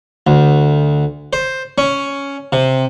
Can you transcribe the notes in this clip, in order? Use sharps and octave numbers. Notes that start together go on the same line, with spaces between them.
D2
C5
C#4
C3